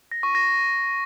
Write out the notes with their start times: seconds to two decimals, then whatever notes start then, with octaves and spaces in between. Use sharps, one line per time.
0.12 A#6
0.23 C#6
0.35 A#6